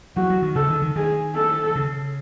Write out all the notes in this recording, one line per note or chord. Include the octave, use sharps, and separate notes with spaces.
F#3 F#4
F#3
D#3
C#3 A4
D#3
D#3
D#3 G#4
A4
C#3